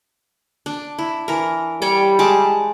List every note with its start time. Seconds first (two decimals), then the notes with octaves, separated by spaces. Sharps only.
0.66 D4
0.98 E4
1.28 E3 A#4
1.82 G3 C#5 D5 G5
2.19 G#3 A5 D6